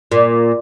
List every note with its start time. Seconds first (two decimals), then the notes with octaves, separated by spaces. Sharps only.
0.12 A#2